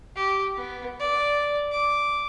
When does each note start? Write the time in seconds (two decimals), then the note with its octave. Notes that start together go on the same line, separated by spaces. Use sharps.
0.16 G4
0.57 B3
1.00 D5
1.71 D6